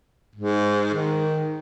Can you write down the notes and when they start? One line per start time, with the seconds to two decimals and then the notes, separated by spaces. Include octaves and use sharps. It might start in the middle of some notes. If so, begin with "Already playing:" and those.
0.36 G#2
0.94 D#3